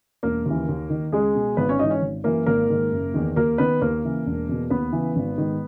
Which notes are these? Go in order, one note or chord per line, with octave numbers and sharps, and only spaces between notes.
E1 A#3 A#4
D#2 C#3 E3
D#2
D#3
C#2 G#3 G#4
B2
G#1 B3 B4
C#4 C#5
G#2 E3 D#4 D#5
C#4 C#5
G#1
F#2 E3 A#3 A#4
G#1 A#3 A#4
G#2 D#3
F#1
E2 D#3
D#2 A#3 A#4
D#3 B3 B4
D#2 A#3 A#4
C#3 E3
E1
E2 B2
D#2 B3 B4
C#3 E3
G#1
G#2 D#3